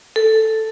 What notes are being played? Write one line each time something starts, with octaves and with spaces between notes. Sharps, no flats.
A4